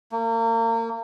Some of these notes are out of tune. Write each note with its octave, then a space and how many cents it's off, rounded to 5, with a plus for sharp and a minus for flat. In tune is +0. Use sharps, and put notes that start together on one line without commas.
A#3 -35